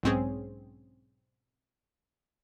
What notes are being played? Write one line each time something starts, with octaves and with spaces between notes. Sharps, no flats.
B1 G#2 C4 C#4 G#4